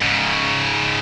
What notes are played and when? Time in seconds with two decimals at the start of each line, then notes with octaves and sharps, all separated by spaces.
0.02 G#2 C#3